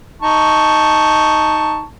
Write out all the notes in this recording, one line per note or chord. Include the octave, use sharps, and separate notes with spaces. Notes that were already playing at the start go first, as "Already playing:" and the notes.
D#4 A5 C#6